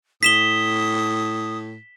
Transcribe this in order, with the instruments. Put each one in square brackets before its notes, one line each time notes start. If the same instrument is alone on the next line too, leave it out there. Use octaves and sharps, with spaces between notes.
[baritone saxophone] A2 [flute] D#6 [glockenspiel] B6 E7 G7